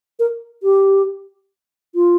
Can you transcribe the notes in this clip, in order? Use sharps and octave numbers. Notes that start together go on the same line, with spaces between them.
A#4
G4
F4